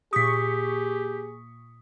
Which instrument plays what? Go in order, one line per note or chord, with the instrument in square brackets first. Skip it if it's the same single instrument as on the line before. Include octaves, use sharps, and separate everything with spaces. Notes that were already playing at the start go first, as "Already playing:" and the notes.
[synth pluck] A#2 C#6 [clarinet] G4 [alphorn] G#4 [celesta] D#6 B6